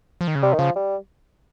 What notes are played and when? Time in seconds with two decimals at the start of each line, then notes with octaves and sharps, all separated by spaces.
0.21 F3
0.28 D#3
0.35 C#3
0.43 C3 G3
0.53 D#3
0.59 C#3 F3
0.75 G3